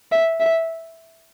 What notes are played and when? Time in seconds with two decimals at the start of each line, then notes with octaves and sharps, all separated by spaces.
0.12 E5
0.40 E5